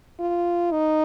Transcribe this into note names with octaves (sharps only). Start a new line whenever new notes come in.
F4
D#4